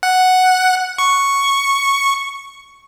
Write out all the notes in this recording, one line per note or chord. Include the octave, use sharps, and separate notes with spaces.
F#5
C#6